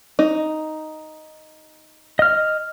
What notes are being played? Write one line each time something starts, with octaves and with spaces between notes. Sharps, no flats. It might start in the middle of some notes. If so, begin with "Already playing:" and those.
D#4
D#5 F6